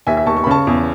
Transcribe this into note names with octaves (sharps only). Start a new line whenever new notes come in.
D#2 E5 G#5
E5
D#2 A5 C#6
C#6
B5
C#3 A5 C#6
E2